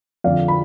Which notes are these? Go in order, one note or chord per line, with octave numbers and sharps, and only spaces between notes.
F2 D3 F3 D5 F5
B5